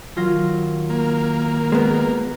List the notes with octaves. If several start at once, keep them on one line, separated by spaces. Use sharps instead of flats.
D#3 F#3 F4 A#6
A#3
G#3 B3